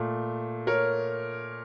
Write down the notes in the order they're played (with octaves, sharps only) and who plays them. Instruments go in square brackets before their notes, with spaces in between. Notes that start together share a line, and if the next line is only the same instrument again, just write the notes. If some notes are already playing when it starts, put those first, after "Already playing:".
Already playing: [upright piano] A#2 A3
A#4 C#5